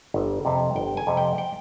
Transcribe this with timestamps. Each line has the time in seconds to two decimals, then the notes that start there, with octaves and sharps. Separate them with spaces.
0.14 G1
0.45 F2 C3
0.76 G1 G5
0.97 G#5
1.07 F2 C3
1.17 G5
1.38 G5